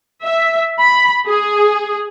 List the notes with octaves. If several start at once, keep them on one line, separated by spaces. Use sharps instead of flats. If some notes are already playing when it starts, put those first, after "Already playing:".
E5
B5
G#4